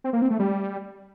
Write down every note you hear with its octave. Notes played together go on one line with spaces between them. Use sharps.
C4
A#3
C4
A3
G3